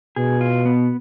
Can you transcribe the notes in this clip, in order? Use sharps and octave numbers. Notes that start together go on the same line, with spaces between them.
B2 G#4
F4
B3